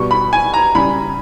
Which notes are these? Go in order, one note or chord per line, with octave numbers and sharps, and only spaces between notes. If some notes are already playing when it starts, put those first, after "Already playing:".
Already playing: B2 G3 C#6
B5
G#5
A#5
C#3 G3 B5